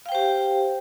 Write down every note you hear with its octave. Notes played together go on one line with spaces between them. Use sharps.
G4 C5 F5 G5